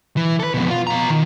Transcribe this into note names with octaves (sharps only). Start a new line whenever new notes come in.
E3
A4 B4
F2 B2
F4
B2 A#5
D#3